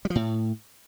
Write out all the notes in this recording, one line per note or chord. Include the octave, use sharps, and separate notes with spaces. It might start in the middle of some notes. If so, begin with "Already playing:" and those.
G3
F3
A2